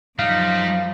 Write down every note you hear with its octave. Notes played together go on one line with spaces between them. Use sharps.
F#2 F3 G3 D#4 F5